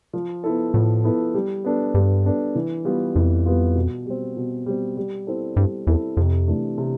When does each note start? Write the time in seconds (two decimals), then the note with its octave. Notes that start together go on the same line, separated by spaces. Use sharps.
0.13 F3
0.44 B3 E4 A4
0.73 A2 F3
1.04 B3 E4 A4
1.34 G3
1.64 B3 D4 A4
1.94 G2 G3
2.25 B3 D4 A4
2.55 E3
2.85 G3 B3 F4
3.15 F2 E3
3.46 G3 B3 F4
3.75 B2
4.06 G3 C4
4.37 B2
4.66 G3 C4
4.97 G3
5.27 C4 E4 A4
5.56 G2 G3
5.87 E2 C4 E4 A4
6.17 F2 C3
6.48 E3 A3 D4
6.78 C3